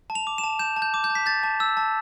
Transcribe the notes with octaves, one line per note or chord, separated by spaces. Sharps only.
A5
F7
D6
E7
A5
G6 E7
A5
G6
D6
G6
A5
B6
G6 A6
A5
E6
A5